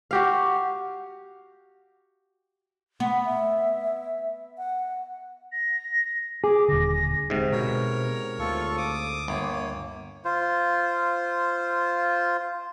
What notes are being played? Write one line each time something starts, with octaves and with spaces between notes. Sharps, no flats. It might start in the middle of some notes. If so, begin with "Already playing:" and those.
F#4 G4 F5
B3
E5
F#5
A#6
G#4 D6
D#1 D3 A#6
G#2 C3
B2 A#4 C#5
D2 F4 A4 C#6
D6 D#6
G1 A#3 C#5
F4 C5